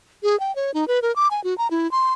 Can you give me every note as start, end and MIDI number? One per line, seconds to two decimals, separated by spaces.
0.23 0.38 68
0.40 0.54 79
0.56 0.71 73
0.74 0.87 63
0.88 1.00 71
1.02 1.14 70
1.16 1.28 86
1.31 1.43 80
1.44 1.57 66
1.58 1.68 82
1.71 1.90 64
1.91 2.13 84